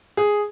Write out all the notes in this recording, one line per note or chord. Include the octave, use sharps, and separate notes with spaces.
G#4